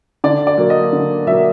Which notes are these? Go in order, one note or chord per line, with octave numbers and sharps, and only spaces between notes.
D3 D5
D5
F#3 A#3
D#5
D3
F#3 A#3 E5